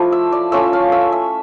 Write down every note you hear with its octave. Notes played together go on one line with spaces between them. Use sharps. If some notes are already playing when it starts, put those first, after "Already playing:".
Already playing: F3 A3 E4 D5
E5
D5
A3 C#4 F4 E5
F5
E5
E5